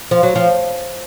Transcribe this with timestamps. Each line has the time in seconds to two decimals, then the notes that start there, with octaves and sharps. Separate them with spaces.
0.11 F3
0.23 F#3
0.35 F3